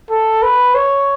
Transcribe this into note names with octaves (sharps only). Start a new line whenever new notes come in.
A4
B4
C#5